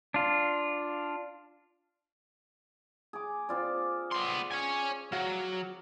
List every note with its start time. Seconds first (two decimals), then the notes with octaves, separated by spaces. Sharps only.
0.14 D4 F4
3.13 G#4 D6
3.49 C4 F4 D5
4.11 B3 C6
4.51 C#5 G#5
5.12 F#3 F5